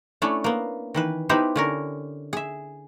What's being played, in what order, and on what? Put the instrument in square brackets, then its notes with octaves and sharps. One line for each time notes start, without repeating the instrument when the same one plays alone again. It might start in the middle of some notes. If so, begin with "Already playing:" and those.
[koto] A3 C#4 D4 E4
A#3 B3
D#3 E3 B4
B3 D#4 E4 G4 B4 C5
D3 C#4 A#4
G#4 E5